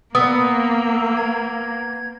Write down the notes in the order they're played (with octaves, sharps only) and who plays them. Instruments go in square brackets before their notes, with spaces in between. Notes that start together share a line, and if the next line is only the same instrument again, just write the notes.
[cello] A#3 [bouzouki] B3 [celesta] D#6 [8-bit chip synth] E6
[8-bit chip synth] G#6